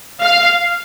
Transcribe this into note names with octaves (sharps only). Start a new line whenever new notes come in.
F5